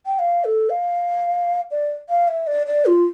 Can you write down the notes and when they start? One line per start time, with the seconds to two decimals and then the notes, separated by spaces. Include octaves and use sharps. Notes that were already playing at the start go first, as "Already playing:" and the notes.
0.06 G5
0.19 F5
0.44 A4
0.70 F5
1.71 D5
2.09 F5
2.28 E5
2.47 D5
2.67 D5
2.86 F4